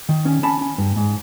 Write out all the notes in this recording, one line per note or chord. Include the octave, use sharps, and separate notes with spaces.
D#3
C#4
C#4 A5 B5
C#4
G2
G#2